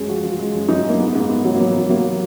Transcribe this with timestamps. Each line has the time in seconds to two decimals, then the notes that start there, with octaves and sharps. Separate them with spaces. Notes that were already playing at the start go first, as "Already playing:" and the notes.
Already playing: F#2 F#3 G#3 G#4
0.08 F3 F#4
0.23 F3 F4
0.39 G#3
0.55 F#2
0.69 F#2 D#4
0.84 F#2
0.89 A#3
0.99 G#2 B3
1.15 G#2 A#3
1.29 G#2 B3
1.45 F#3
1.55 A#3
1.60 F#3 B3
1.75 F#3
1.89 F#3 A#3